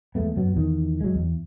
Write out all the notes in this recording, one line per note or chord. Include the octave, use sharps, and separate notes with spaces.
E2 G#3 A3 B3
F#2 F#3 B3
E2 D#3
F#3 G#3
E2